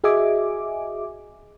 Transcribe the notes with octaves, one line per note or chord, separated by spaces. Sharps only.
F#4 G#4 D#5 E5 G#5 D6